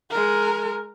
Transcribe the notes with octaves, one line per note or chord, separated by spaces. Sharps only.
G#3 A#4